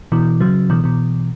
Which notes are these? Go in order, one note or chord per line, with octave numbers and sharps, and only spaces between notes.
B2 E3
C#3 F#3
B2 E3
B2 E3